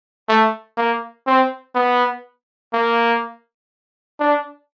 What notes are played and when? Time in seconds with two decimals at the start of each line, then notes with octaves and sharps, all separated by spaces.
0.29 A3
0.77 A#3
1.27 C4
1.75 B3
2.73 A#3
4.20 D4